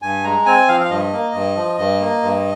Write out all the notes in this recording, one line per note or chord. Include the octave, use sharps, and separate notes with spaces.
G2 G#5
G#3 A#5
C4 G#5
F3 F5
F5
G2 D#5
A#3
G2
F3
G2
A#3
G2